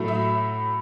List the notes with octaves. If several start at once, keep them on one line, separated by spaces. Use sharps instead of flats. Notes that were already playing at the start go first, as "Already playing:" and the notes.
Already playing: A2 F#3 A3
E5